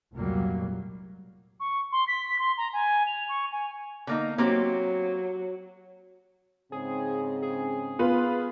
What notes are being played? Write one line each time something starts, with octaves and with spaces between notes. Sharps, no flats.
F1 C#2 A#2 F#3 G3 A#3
C#6
C6
B6
C6
A#5
G#5
F7
C#6
G#5
D3 A#3 D#4
F#3 A#3 C4 G4
G#2 C#3 C4 G#4
G#4
B3 F4 B4